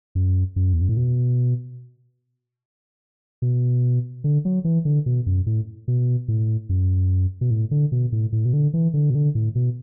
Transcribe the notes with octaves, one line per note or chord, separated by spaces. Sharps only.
F#2
F#2
E2
F#2
A2
B2
B2
D3
F#3
E3
D3
B2
F#2
A2
B2
A2
F#2
B2
A2
D3
B2
A2
A2
B2
D3
E3
D3
B2
D3
A2
B2